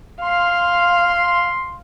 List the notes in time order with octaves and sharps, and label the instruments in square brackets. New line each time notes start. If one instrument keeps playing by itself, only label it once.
[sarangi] F5 [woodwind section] C6